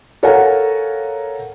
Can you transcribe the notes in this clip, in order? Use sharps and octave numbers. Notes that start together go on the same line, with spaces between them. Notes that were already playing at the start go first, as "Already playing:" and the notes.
A4 A#4 C#5 F5 F#5 G#5